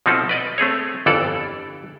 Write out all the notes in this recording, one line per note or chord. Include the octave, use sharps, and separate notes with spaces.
B2 F3 C4 D#4 E4 A4
B4 D5 D#5
A3 C4 G#4 C#5
G1 F2 E3 A4 D5